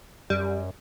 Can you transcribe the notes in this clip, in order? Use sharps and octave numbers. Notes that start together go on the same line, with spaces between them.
F#2 G3